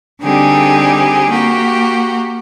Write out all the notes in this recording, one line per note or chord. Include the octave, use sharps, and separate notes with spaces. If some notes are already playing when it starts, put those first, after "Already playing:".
D3 G3 C4 D#4 G4 G#4
A#3 F#4 G4